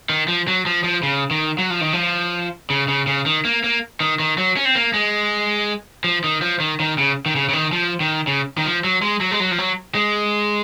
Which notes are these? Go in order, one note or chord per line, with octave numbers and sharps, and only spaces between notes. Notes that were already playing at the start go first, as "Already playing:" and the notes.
D#3
F3
F#3
F3
F3
C#3
D#3
F#3
F3
D#3
F3
C#3
C#3
C#3
D#3
A#3
A#3
D#3
D#3
F#3
C#4
C4
A#3
G#3
F3
D#3
F3
D#3
D#3
C#3
D#3
C#3
C#3
D#3
F3
D#3
C#3
D#3
F3
F#3
G#3
F#3
G#3
F#3
F3
F#3
G#3